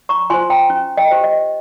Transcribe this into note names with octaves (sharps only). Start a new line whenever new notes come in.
A#5 C#6
F4 C5 G#5 C6
G5 A#5
C#4
D#5 G5
G4 C5
D#5